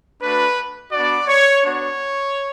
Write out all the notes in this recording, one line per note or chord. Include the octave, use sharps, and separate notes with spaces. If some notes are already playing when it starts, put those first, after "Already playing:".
A3 D4 F#4 B4
B3 D4 F#4 D5
C#5
B3 D4 F#4 C#5